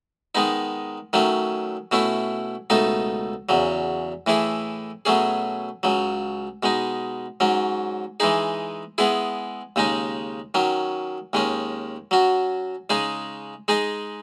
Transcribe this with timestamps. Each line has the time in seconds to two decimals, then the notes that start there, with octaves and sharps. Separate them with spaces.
0.35 D#3 G#3 B3 D#4
1.13 D#3 F#3 A3 C#4
1.92 B2 A3 C#4 E4
2.70 C#2 B2 A3 D#4 A4
3.49 E2 C#3 F#3
4.27 A2 E3 A3 E4 G#4
5.05 B2 F#3 A3 C#4 G#4
5.83 C#2 C#3 F#3
6.63 B2 G#3 D#4
7.40 G#2 F#3 C#4
8.20 E3 G#3 D#4 G#4
8.98 G#3 B3 E4 G#4
9.76 D#2 C#3 G#3 D#4
10.54 D#3 F#3 C#4
11.33 D#2 D#3 G#3 C#4
12.11 F#3 C#4 F#4
12.90 C#3 G#3 D#4 G#4
13.68 G#3 D#4 G#4 D#5